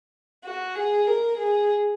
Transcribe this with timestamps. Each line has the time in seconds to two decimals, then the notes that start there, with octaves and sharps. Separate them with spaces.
0.45 F#4
0.75 G#4
1.07 A#4
1.38 G#4